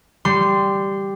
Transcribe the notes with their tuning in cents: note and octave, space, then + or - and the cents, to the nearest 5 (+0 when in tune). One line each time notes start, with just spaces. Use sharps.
G3 +0 C6 -15